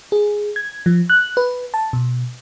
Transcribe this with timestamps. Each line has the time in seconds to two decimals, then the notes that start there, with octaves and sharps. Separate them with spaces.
0.12 G#4
0.56 G#6
0.86 F3
1.10 F#6
1.37 B4
1.74 A5
1.93 B2